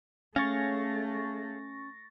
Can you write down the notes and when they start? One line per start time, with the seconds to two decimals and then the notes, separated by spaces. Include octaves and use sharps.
0.36 A3 C#4 G#4 C#5 F5 C#6 A6 A#6